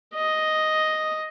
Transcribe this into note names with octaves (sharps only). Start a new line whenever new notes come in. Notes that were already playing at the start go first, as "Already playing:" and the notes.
D#5